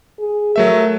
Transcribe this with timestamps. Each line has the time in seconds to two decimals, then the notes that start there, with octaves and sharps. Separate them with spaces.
0.19 G#4
0.56 F#3 A3 A#4 E5